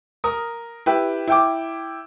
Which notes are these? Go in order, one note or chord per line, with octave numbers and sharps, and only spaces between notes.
A#4 D#6
E4 G4 B4
E4 G5 D6